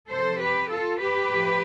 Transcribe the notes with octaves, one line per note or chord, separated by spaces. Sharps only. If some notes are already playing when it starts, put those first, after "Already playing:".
C3 F3 A4 C5
G4 B4
F4 A4
G4 B4
A2 F3